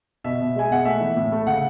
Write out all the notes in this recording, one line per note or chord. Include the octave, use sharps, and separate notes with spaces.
B2 E5
B2
G#3 G#5
B2 F#5
A3 E5
E3
A2
A3
C#3 F#5